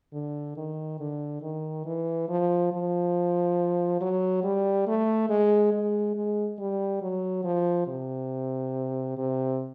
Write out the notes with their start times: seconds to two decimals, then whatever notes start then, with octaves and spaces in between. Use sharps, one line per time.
0.13 D3
0.57 D#3
1.00 D3
1.42 D#3
1.85 E3
2.28 F3
2.72 F3
4.01 F#3
4.43 G3
4.87 A3
5.29 G#3
5.73 G#3
6.16 G#3
6.59 G3
7.02 F#3
7.44 F3
7.87 C3
9.17 C3